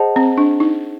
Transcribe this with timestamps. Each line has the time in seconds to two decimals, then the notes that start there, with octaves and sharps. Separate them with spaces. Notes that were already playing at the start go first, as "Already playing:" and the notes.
Already playing: G#4 C5 D#5 F#5 A5
0.16 C4
0.38 D4
0.60 D#4